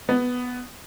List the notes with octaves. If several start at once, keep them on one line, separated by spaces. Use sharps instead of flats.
B3